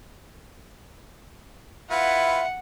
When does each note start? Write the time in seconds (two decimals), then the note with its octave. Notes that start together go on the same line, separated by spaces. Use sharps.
1.91 E4 F4 B4 E5 F#5